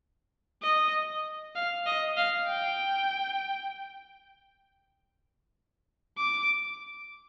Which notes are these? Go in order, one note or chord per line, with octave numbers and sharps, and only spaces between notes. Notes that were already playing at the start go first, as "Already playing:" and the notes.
D#5
F5
D#5
F5
G5
D6